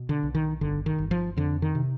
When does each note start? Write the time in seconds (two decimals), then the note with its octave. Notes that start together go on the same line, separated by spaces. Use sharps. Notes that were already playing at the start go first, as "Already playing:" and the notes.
Already playing: B2
0.09 D3
0.23 B1
0.35 D#3
0.61 G1 D3
0.86 D#3
0.98 G1
1.11 F3
1.37 F2 D3
1.62 D#3
1.75 C3